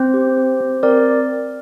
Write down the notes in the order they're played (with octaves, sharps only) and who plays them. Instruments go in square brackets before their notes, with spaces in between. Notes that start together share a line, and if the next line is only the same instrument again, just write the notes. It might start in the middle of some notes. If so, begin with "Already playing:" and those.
Already playing: [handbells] C4 C5
G4
G4
C4
C4 A#4 D5